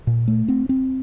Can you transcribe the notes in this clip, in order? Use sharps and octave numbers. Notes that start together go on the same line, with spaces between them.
A#2
A3
C4
C4